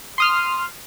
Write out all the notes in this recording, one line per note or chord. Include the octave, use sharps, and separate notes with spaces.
C6 D#6 F6